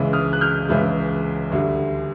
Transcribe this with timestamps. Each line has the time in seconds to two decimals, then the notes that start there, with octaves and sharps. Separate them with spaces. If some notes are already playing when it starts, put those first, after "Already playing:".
Already playing: C#2 C#3 E3 G#3
0.13 D#6 F6
0.33 F#6
0.41 F6 G6
0.68 C#2 C#3 E3 G#3
1.52 D2 D3 G3